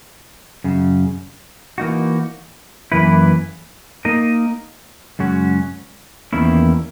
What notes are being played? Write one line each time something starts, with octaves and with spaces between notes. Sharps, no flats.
F#2 C#3
E3 A#3 D#4 F#4
F#2 E3 A#3 E4 B4
A#3 D#4 A#4 D#5
F#2 C#3 G#3 C#4 F#4
E2 D#3 A#3 C#4 E4